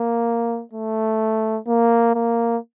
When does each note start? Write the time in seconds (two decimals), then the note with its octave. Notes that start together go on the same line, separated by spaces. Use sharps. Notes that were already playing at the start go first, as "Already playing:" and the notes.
Already playing: A#3
0.73 A3
1.67 A#3
2.15 A#3